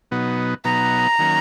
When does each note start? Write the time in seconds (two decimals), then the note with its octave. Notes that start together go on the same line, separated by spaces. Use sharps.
0.11 B2 F#3 B3 D#4
0.64 B2 F#3 B3 D#4 A#5
1.19 D#3 F#3 A#3 C#4